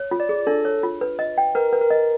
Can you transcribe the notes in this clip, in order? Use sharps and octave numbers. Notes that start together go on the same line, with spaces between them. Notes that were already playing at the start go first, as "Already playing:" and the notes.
Already playing: C#5
F4
D5
G#4
D4 A4
C#5
F4
B4
D#5
G5
A#4 B4
B4
A#4
D#5